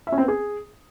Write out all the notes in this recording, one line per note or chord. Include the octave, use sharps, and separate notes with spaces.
E5
C#4
C4
B3
G#4